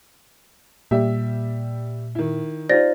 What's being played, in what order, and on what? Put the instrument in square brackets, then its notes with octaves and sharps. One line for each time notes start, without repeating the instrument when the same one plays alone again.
[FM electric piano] A#2 [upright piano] G3 G4 E5
[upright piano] D#3 E4
[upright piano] D#4 F4 G4 [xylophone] C5 D5 A#6